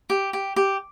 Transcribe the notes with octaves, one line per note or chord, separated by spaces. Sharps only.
G4
G4
G4